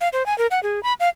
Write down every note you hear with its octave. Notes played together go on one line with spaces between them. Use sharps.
F5
C5
G#5
A#4
F#5
G#4
B5
F5